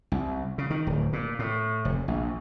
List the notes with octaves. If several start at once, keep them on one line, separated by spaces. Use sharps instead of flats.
C2
C#3
D#3
D1
A#2
A2
F1
A#1